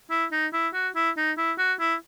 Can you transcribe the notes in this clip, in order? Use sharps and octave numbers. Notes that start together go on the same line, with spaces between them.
E4
D#4
E4
F#4
E4
D#4
E4
F#4
E4